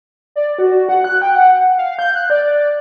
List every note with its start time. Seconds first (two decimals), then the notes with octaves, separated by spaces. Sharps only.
0.36 D5
0.59 F#4
0.89 F#5
1.04 F#6
1.22 G5
1.35 F#5
1.78 F5
1.99 G6
2.15 F#6
2.30 D5